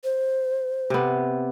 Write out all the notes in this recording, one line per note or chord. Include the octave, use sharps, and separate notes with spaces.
C5
C3 B3